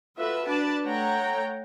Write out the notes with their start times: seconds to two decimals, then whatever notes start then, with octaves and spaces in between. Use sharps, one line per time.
0.18 F4 F#4 A4 B4 E5
0.47 D4 B4 D5 A5
0.84 A3 C#5 F#5 G5 A#5